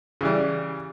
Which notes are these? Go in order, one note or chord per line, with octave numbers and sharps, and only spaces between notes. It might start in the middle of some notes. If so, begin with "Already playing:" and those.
C#3 E3 G3